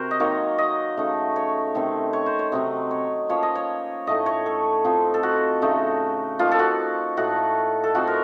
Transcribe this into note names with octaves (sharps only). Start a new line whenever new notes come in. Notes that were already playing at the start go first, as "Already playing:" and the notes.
Already playing: C3 C4 F#4 A#4 C5
D#5
D#3 F#3 A#3 D#4 C#5
D#5
C#3 A3 D#4
C#5
C3 D#3 A3 C4
C#5
C5
C#5
C3 F#3 C4 D#4 D#5
C#5
F3 A#3 C#4 C#5
D#5
C#5
A2 A3 D#4 D#5
C#5
A4
F3 C4 D#4
A4
F#4
C#3 A3 D#4
F3 A#3 D#4 F4
A4
F#4
A2 A3 D#4 F#4
A4
F3 C4 D#4 F#4
A#4